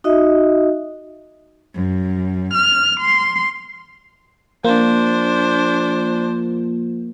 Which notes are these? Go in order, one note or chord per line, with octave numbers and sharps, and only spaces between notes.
D#4 F#4 D#5 E5
F#2
F6
C6
F3 A#3 D4 C5